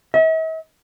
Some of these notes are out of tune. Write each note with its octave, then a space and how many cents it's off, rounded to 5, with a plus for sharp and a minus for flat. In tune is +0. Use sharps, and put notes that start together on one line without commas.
E5 -45